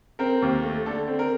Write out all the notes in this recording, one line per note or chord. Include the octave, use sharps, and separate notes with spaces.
C4 A#4
D#2
A3
D3 A4
C4
A#4